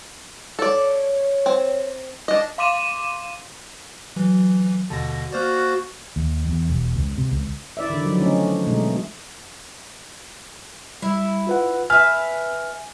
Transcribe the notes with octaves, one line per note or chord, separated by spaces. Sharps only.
A4 C#5 D5
C4
D4 D#5
F5 C6 D6 D#7 E7
E3 F#3
D#2 B2 D3 A5 A#6
A#3 F#4 C5 D5 F6 F#6 A6
D#2
E2
E1
C#2
C3
C#2
E4 D5 E5
D3 D#3
F3 F#3
D3 F3 A3 C#4 D#4
B2 G#3 A3 D#4
G3 E4
F4 B4 F#5
B4 E5 G#5 F6